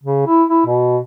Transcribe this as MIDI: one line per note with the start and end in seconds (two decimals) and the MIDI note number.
0.04 0.23 49
0.27 0.44 64
0.50 0.62 64
0.67 0.98 47